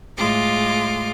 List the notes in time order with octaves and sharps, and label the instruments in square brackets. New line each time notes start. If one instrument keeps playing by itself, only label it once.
[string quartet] A2 G#3 F4 D6